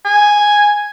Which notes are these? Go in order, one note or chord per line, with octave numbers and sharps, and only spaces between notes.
G#5